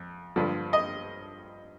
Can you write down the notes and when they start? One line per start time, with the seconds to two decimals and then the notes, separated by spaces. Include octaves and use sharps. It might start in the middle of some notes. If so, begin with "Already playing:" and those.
Already playing: F2
0.36 G2 D3 F3
0.73 D#5